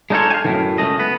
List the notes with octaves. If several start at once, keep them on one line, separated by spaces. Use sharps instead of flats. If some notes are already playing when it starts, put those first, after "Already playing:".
G#3 D4 D#4 F4 A4 C#5
F5 G#5
F#2 A2 D#3
C#2 A3 D#5
B3 B4